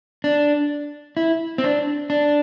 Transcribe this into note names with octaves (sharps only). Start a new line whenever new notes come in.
D4
E4
C4
D4
D4